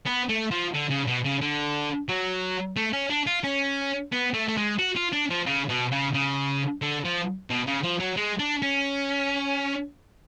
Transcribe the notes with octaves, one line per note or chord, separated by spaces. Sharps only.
B3
A3
F3
D3
C#3
B2
C#3
D3
F#3
A3
C#4
D4
F4
C#4
B3
A3
A3
G#3
F#4
F4
D4
F3
C#3
B2
C#3
C#3
D3
F3
B2
C#3
F3
F#3
G#3
D4
C#4